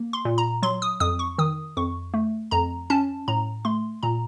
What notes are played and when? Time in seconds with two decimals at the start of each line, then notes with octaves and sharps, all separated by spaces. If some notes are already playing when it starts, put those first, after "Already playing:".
Already playing: A#3
0.13 C6
0.25 A#2
0.38 A#5
0.62 F#3 C6
0.82 D#6
1.00 F2 D#6
1.19 C#6
1.38 D#3 D#6
1.77 F2 C#6
2.14 A3
2.51 F2 A#5
2.90 C#4 A5
3.28 A2 A#5
3.65 A3 C6
4.03 A#2 A#5